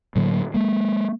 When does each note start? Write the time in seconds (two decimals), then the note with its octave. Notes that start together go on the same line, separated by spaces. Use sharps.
0.16 A2 D3 F#3 A#3
0.54 G#3 A#3